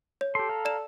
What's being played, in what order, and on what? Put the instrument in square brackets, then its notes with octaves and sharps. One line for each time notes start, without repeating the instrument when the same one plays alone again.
[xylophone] C#5
[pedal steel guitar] G4 C6 [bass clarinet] A4
[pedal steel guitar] F5 A#5
[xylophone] D5 E7